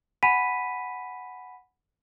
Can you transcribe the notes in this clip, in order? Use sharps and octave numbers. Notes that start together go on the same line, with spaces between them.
F#5 G#5 B5 B6 D#7